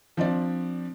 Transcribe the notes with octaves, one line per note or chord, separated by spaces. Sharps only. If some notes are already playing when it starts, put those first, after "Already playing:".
F3 C4 D4 D5